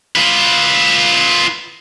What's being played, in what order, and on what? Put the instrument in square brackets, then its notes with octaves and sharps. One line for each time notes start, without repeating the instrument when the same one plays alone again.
[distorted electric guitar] F4 B4